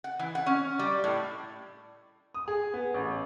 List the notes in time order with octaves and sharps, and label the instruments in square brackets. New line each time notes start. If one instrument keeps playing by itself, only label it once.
[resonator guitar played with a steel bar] F#5
E3
F#5
C#4
G3
A2
[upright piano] D#6
G#4
B3
A1